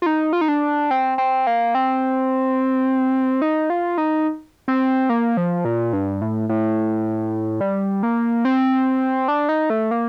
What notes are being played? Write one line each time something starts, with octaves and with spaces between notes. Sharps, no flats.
F4
D#4
F4
D#4
D4
C4
C4
A#3
C4
D#4
F4
D#4
C4
A#3
F3
A#2
G2
A2
A2
G3
A#3
C4
D4
D#4
A3
A#3